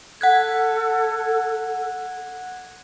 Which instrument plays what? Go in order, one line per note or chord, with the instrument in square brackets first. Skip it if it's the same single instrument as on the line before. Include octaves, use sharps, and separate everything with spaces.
[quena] A4 [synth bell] F#5 F#6 G#6